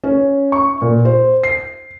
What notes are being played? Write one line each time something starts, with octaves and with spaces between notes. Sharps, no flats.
C#4
C#6
A#2
C5
C7